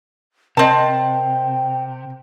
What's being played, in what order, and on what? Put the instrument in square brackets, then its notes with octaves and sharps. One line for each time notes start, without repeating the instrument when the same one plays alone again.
[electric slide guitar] C3 [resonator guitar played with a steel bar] C4 A5 [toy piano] A#4 D#5 [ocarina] G5